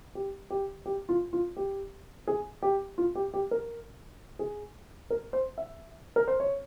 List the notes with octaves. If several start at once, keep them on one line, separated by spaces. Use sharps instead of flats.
G4
G4
G4
F4
F4
G4
G#4
G4
F4
G4
G4
A#4
G#4
A#4
C5
E5
A#4
C5
C#5